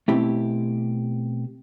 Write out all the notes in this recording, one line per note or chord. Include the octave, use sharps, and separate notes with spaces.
B2 A3 C4 E4 G4